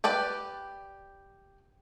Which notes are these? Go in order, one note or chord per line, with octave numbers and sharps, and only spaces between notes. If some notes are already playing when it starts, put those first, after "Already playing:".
G4 B4 D5 G5